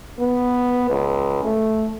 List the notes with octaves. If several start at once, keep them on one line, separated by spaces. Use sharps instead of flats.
B3
C#2
A3